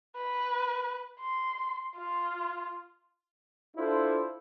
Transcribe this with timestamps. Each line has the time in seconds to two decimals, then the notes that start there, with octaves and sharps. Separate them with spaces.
0.18 B4
1.20 C6
1.97 F4
3.76 D4 E4 F4 A4 C5